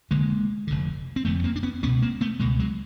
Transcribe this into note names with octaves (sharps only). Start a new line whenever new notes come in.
F1 F2 D3 G#3 A#3
F1 F2 D3
C4
F1 F2 D3 A3 B3
A#3 C4
D4
B3 C#4
C#2 B2 B3 C#4
A#3 C4
A3 B3
C#2 B2 G#3 A#3
F#3 G#3